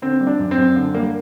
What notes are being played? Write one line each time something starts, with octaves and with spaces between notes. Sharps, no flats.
D3 C4
G3
D4
F#2
C4
F#2
D3
G3 A#3